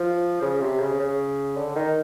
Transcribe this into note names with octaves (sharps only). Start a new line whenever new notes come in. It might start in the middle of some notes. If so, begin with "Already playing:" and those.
Already playing: F3
C#3
C3
C#3
C#3
D3
D#3